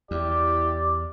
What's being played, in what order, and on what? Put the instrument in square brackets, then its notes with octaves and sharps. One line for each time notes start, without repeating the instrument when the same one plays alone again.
[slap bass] E2 [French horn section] E4 G4 [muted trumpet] D5